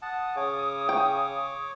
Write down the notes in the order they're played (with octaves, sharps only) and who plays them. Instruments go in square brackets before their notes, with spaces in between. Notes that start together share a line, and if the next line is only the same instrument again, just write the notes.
[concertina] F#5 A5 [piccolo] D#6
[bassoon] C#3 [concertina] C#5 D6
[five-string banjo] G5